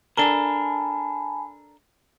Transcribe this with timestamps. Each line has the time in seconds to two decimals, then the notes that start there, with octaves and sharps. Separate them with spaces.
0.17 D4 A4 A#4 G#5 A5 B5